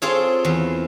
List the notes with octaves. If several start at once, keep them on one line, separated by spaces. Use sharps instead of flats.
C4 F4 G#4 A4 C#5
E2